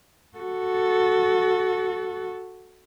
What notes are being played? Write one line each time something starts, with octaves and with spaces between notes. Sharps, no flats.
F#4 A4